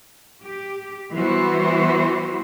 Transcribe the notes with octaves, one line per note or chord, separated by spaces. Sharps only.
G4
E3 G3 B3 E4 F#4 C5